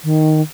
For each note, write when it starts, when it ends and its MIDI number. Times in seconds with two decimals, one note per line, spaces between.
0.04 0.41 51